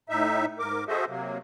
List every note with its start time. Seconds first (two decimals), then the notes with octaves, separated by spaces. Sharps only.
0.09 A2 D#4 E5
0.59 G#2 A#4 D6
0.88 F#4 G#4 A4 C5 D#5 E5
1.08 C3 F#3 A#3